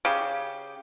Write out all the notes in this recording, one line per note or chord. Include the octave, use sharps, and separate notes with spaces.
C#3 G4